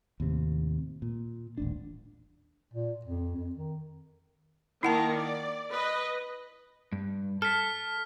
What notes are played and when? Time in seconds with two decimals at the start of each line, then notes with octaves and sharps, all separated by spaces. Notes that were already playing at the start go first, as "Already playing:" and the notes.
0.20 D#2 A2 C3
1.02 A#2
1.58 D#1 A1 D4
2.74 A#2
3.05 F2
3.36 F2
3.55 D#3
4.83 D#3 A#3 E4 F#5 A5 A#5
5.14 D5
5.71 B4 D#5
6.92 G2
7.42 A4 F6 B6